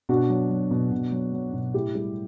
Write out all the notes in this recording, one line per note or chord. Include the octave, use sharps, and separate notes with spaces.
B2 D4 F#4
F#3
F#3
B2
B2
F#3
F#3
B2
A2 E4 G4
G3